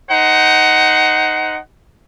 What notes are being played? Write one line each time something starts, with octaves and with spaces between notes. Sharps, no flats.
D#4 C5 F#5